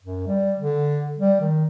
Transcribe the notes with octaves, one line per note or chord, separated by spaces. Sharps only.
F#2
G3
D3
G3
D#3